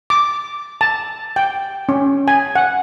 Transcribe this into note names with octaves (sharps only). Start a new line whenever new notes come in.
D6
A5
G5
C#4
G#5
F#5